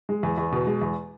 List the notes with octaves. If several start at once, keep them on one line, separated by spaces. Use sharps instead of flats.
G#3
E2
E2
B2
G#3
E2